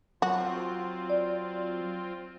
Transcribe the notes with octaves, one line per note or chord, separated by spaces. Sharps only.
F#3 C4 F4 F#4
D5